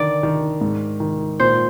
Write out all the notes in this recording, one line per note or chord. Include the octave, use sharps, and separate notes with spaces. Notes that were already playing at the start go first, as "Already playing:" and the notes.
Already playing: D3 D#3 D5
D#3
G#2
D#3
A#2 C5